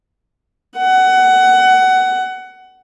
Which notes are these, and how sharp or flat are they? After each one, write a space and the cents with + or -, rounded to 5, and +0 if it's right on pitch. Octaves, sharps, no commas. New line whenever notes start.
F#5 +20